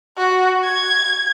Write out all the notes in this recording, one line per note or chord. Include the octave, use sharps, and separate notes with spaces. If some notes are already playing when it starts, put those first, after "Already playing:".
F#4
G#6